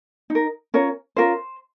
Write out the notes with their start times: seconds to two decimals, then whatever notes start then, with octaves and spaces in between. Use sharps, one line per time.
0.30 D#4
0.35 A#4
0.74 C#4 F4 A#4 C#5
1.16 C#4 F4 A#4 C5